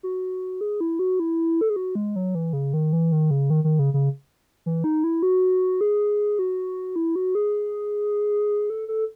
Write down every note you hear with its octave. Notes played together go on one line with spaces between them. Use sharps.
F#4
G#4
E4
F#4
E4
A4
G#4
F#4
G#3
F#3
E3
C#3
D#3
E3
D#3
C#3
D#3
D#3
C#3
C#3
E3
D#4
E4
F#4
G#4
F#4
E4
F#4
G#4
A4
A4